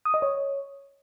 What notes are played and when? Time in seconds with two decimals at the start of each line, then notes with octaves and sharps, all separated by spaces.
0.05 D#6
0.14 D#5
0.22 C#5